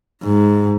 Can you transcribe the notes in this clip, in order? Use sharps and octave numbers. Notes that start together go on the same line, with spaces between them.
G#2